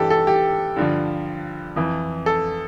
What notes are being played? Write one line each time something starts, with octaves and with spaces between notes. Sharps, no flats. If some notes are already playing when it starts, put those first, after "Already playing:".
Already playing: G2 E3 G4 A4
A4
G4
G2 D3 F3
F2 E3
A4